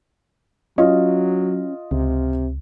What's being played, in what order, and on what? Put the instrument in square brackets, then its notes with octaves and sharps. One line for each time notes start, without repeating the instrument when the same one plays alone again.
[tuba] F#3 [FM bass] C#4 [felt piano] F4 D#5
[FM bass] C#2 [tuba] C3